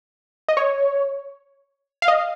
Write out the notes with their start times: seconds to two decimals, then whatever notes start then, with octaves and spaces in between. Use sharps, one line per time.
0.48 D#5
0.57 C#5
2.02 F5
2.08 D#5